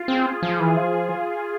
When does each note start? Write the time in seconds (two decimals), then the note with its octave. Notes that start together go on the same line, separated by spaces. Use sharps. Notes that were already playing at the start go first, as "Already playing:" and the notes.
Already playing: F4
0.08 C4 G#4
0.43 F3
0.60 E3
0.76 F3